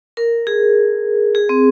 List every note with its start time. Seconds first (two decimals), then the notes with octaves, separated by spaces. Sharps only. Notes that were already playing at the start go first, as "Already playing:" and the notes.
0.17 A#4
0.47 G#4
1.35 G#4
1.49 C4